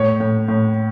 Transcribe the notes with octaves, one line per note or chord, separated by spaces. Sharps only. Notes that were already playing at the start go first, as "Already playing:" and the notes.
Already playing: A2 C#5
A2
A2